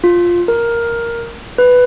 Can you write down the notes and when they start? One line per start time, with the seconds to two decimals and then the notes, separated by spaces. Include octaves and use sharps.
0.04 F4
0.48 A#4
1.58 B4